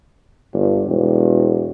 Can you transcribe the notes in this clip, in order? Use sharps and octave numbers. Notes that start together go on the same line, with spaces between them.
G1
E1